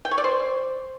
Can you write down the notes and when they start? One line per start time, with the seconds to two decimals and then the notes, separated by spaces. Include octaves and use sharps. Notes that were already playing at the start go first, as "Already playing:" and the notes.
0.05 G5
0.11 C#5
0.18 D5
0.24 C5